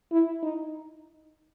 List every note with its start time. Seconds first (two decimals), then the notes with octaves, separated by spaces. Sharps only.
0.12 E4
0.43 D#4